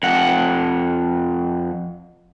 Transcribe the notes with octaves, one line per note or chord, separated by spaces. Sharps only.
F2 F#5